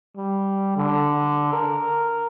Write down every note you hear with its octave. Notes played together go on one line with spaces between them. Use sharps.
G3
D3
A#4